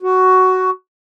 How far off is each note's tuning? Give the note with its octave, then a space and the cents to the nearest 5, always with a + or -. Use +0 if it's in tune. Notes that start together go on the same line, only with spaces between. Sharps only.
F#4 +10